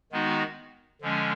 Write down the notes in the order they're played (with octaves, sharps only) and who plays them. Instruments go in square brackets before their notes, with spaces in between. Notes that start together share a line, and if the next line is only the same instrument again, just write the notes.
[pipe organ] D#3 G#3 B3 D#4 F#4
D3 F3 G#3 C#4